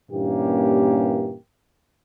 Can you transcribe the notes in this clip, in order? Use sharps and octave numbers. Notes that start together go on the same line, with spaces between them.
G2 A#2 E3 A#3 C#4 G4